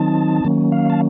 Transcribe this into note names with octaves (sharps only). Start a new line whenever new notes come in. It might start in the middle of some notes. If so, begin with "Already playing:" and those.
Already playing: D#3 F#3 C4 D#4 A5
D#3 F#3 A#3 C#4
F5
A5